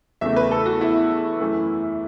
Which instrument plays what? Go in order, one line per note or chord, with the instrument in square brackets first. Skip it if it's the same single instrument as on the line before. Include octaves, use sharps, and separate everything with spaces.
[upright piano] E2 C#3 A3 E5
B4
A4
F#4
E4
F#2 E3 A3